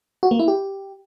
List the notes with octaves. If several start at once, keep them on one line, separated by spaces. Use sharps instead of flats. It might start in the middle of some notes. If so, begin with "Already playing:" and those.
F#4
A#3
E4
G4